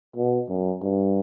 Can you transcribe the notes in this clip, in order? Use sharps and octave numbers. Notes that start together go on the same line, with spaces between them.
B2
F#2
G2